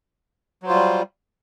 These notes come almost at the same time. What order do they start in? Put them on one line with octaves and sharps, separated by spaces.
F#3 C5 F4 G3